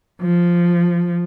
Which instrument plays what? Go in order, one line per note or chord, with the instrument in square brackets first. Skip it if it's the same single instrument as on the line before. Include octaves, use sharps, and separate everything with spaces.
[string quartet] F3